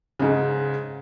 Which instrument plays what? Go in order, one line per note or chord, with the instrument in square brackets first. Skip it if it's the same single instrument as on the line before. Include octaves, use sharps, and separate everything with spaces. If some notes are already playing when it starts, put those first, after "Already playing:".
[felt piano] G#2 C#3